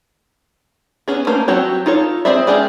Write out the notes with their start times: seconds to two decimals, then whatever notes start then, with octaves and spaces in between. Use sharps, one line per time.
1.08 B3 C#4 G#4
1.27 A3 A#3 C#4 C5
1.48 F#3 C4 F#4 G4 C#5
1.86 D#4 F4 A4 C#5
2.25 C4 G#4 C5 D5 E5
2.47 G#3 C#4 G4 G#4 D5